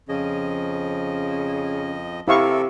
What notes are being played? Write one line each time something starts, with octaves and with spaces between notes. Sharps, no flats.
F2 C#3 F3 D#5
C3 E4 A4 A#4 F5 C#6